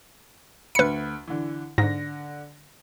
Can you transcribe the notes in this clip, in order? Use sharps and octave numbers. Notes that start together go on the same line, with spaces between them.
D2 B4 B5 C#7
D3 E3
G#2 D3 A#6